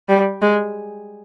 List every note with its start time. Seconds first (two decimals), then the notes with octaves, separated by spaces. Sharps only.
0.09 G3
0.41 G#3